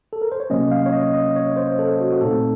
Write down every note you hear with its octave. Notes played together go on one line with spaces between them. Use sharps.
A4
A#4
C5
C#5
C3 F#3 A#3 C#4 D#5
F5
C#5
D#5
D#5
C#5
C5
A4
F#4
F#4
A#2 A3 C4 D#4 A4